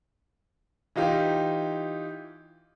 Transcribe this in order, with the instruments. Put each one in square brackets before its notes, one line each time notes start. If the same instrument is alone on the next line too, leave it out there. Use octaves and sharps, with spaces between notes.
[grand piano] E3 D#4 F4 G4